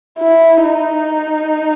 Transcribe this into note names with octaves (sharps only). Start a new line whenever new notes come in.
E4
D#4